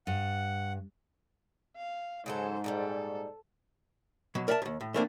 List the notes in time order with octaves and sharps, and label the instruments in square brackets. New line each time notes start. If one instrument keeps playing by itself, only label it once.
[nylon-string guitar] G2 [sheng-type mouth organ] F#5
[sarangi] F5
[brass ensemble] G#2 [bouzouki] C#3 F#3 A4 [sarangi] C5
[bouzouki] A#2 D#3 G3 [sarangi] A4
[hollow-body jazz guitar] B2 F#3
A#4 D5 E5 F#5 A5
D#2 G#2
A2
E3 A3 A#3 C4 D4